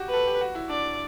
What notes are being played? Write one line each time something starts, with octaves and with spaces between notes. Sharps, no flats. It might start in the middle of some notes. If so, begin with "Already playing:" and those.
Already playing: F#4 G4
A4 B4
G4
F#4
E4
D4 D5